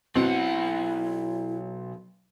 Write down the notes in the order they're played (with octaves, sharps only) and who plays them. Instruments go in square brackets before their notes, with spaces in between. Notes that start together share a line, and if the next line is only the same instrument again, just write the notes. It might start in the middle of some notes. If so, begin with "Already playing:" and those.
[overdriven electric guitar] B1 F#5 [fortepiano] B2 C4 [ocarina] E4